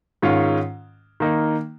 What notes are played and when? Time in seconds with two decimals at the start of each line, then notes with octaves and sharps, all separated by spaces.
0.22 G#2 D#3 G#3 C#4 F4
1.20 D#3 A#3 D#4